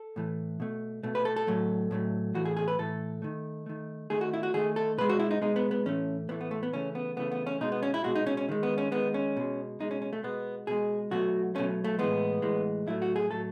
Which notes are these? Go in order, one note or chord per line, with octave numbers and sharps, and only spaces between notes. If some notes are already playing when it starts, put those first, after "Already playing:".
Already playing: A4
A2 E3 A3
B2 A3
B2 A3
B4
A4
A4
A2 F#3 A3
A2 F#3 A3
A2 E3 A3 F#4
G#4
G#4
B4
A2 E3 A3 A4
D#3 A3
D#3 A3
D#3 A3 G#4
F#4
E4
F#4
D#3 A3 G#4
A4
B2 G#3 B4
F#4
E4
D#4
B2 G#3 D#4
B3
B3
A2 E3 A3 C#4
A2 E3 A3 B3
B3
A3
B3
C#3 E3 A3 C#4
B3
C#3 E3 A3 B3
B3
C#4
B2 G#3 D#4
B3
C#4
E4
B2 G#3 F#4
D#4
C#4
C#4
D#3 G#3
B3
C#4
D#3 G#3 B3
C#4
B2 G#3
B2 G#3 D#4
C#4
C#4
A3
B2 G#3 B3
B2 G#3 G#4
B2 F#3 A3 F#4
B2 F#3 A3 C#4
A3
A2 E3 G#3 B3
A2 E3 G#3
A2 F#3 A3 E4
F#4
G#4
A2 F#3 A3 A4